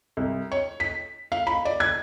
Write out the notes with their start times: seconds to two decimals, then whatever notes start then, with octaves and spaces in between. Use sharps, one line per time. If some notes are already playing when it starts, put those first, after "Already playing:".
0.17 C2
0.52 C#5
0.80 B6
1.32 F5
1.47 B5
1.65 D5
1.80 G#6